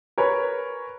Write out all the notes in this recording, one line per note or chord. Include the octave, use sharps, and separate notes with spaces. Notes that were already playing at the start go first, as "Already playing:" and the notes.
A#4 B4 C#5 G#5 B5